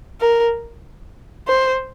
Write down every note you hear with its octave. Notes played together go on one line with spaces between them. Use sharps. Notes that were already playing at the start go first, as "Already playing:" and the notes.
A#4
C5